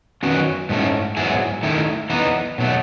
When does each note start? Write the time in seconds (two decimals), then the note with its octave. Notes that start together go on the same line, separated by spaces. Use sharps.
0.23 D#3 F#3 C#4 F#4 B4
0.69 G#2 F#3 A3 C#4 E4
1.17 G#2 F#3 B3 E4 G#4
1.63 D#3 A3 E4
2.10 E3 B3 D#4
2.58 B2 F#3 A3